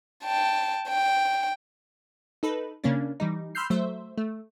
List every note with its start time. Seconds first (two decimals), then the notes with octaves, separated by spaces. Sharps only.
0.24 G5 A5
0.88 G5
2.43 D#4 A4 B4
2.84 C#3 A#3 C#4 D4
3.20 E3 G3 D#4
3.55 B5 C6 E6 F6 G6 C7
3.70 F#3 A3 C5 E5
4.18 A3